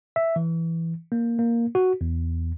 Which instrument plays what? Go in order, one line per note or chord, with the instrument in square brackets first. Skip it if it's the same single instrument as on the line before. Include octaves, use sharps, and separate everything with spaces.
[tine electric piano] E5
E3
A#3
A#3
F#4
E2